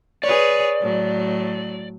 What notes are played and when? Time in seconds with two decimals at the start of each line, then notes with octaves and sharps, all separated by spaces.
0.24 G#4 B4 C#5 D5
0.81 A2 F#3